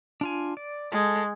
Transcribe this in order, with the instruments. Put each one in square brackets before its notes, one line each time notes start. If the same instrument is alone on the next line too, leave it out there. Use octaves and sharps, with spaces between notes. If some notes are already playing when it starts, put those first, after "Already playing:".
[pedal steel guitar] D4 F4 G#5
D5
[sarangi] G#3 [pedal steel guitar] A4